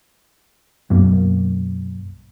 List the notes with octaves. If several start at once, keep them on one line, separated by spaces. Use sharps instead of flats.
B1 F#2 A#3